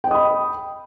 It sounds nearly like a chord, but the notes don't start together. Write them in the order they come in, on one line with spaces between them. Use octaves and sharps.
G5 D#5 D#6 B5